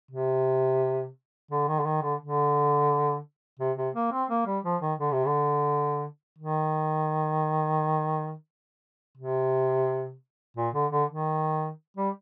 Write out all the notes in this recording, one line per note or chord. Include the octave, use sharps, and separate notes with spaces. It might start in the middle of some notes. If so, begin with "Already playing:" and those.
C3
D3
D#3
D3
D#3
D3
D3
C3
C3
A#3
C4
A#3
G3
F3
D#3
D3
C3
D3
D#3
C3
A#2
D3
D3
D#3
G3